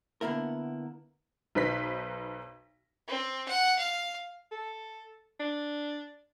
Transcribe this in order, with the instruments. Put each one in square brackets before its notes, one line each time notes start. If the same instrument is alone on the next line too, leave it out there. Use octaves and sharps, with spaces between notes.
[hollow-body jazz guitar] D3 A#3 B3 E4 A#4
[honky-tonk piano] B1 D#4 B4 C5 B6
[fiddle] C4
F#5
F5
[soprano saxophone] A4
D4